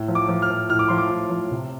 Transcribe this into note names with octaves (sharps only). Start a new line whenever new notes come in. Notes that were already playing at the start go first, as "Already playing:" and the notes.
Already playing: A2
F3
D6
F3
F6
F3
A2 F6
D6
F3 C6
D6
A2
F3
C3